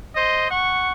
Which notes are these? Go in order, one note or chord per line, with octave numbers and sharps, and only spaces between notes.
C5 D#5
F#5 C#6